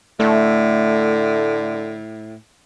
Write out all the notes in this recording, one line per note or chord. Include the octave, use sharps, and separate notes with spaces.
A2 D3 A3